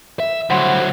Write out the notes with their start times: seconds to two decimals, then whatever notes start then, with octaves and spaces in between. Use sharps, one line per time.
0.20 E5
0.50 D3 F#3 E4 C5 F#5 C6